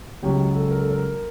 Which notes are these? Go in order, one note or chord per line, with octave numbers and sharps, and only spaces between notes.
C#2 C#3 F#3 G4
A4
A#4
A4
A#4